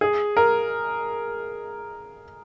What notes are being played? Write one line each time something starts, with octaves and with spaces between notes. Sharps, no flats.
G#4
A#4